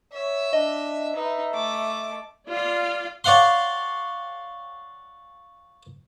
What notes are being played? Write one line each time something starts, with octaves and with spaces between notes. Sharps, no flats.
C#5 E5
D4 D#5
D#4 B4 E5
A3 D6
F4 D5 F5
C#5 D5 F5 F#5 C6